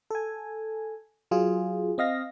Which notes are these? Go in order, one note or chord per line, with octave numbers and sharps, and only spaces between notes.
A4 G#5
F#3 F4 G#4
C4 D#5 F5 A#6